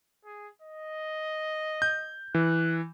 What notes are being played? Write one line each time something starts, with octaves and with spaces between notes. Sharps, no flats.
G#4
D#5
G6
E3 F#6